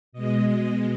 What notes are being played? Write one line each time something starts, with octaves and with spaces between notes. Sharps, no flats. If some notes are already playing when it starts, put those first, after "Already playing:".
B2 G#3 D#5